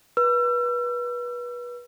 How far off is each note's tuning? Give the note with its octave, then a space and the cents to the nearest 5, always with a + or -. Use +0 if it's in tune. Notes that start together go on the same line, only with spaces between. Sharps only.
B4 -25 E6 +40